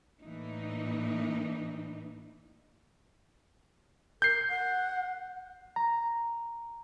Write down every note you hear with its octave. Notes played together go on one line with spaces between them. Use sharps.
A2 E3 A#3 D4 D#4
A#4 G6 C7
F#5
A#5